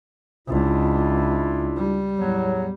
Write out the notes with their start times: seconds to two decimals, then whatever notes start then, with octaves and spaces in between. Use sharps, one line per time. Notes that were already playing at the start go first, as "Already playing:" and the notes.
0.48 C#2 D4 E4 F4
1.77 G3
2.17 E2 A2 F#3